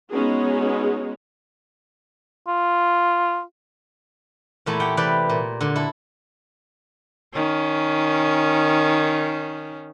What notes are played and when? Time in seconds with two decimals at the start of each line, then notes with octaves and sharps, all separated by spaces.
0.12 G#3 B3 C#4 D#4 F#4 G#4
2.48 F4
4.66 E2 A#2 A3 E4 G#5 A5
4.80 G4 F#5 G5
4.97 C3 E3 B4 D5 G5
5.29 A#2
5.61 A#2 D3
5.76 E4 A4
7.34 D#3 C#4